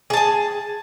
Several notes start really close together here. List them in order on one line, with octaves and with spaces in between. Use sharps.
G#4 A5 G#5